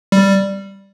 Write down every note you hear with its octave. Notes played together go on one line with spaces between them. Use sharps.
G3